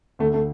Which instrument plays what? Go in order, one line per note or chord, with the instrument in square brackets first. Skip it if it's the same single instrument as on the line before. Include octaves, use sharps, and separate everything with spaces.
[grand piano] D2 [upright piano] A3
[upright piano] A3